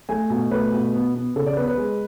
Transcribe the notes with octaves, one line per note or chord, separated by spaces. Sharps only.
A3 G#5
B2
A3 B4
B2
B3
B3
C#3 A4
D5
B3 B4
B4
G#3